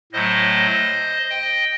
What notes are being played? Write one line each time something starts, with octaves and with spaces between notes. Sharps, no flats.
A2 F#3 A3 C5 D#5
D#5 G5